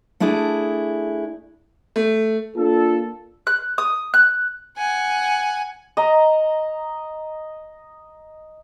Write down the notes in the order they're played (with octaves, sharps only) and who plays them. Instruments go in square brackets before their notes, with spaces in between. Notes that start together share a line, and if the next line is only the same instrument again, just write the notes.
[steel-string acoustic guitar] A3 D4 E4 G#4
[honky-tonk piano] A3
[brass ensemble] A#3 D4 F4 A4
[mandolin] F#6
D#6
F#6
[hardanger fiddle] F#5 G#5
[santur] D#5 A#5